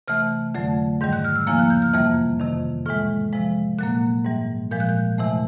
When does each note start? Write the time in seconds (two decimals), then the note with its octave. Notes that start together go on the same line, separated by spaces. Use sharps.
0.08 C3 E3 A3 F6
0.55 F2 D3 F#3 A3
1.01 G#2 D#3 G3 G6
1.13 F#6
1.24 F6
1.36 E6
1.47 E2 C#3 F3 A#3 F6
1.59 F#6
1.70 G6
1.82 F6
1.93 F2 C3 E3 G3 A#3 F6
2.39 F2 C3 D#3
2.86 A2 E3 G#3 F6
3.33 C3 F3 G#3
3.79 A#2 F#3 A#3 F#6
4.25 G#2 E3 G3
4.71 A#2 F3 G#3 G6
4.80 F#6
4.89 G6
5.18 E2 C3 E3 A3